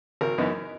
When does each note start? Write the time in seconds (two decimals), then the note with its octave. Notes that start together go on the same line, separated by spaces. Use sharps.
0.21 G#1 A#4
0.38 F#2 E3 B3 D#4